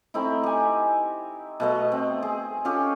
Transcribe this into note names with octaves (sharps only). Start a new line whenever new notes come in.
A3 C4 D#4 E4
G4 G#5
B2 A3 D#5
C4
G#4
C#4 F4 G4 A4